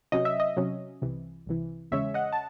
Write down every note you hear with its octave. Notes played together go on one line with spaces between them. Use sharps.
C3 F#3 C#4 D#5
E5
D#5
C3 F#3 C#4
C2 C3 E3
C2 C3 E3
E2 C#3 G#3 C#4 C#5 E5
D#5 F#5
A5